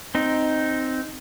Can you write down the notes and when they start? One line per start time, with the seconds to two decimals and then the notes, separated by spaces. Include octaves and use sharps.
0.15 C4 D#4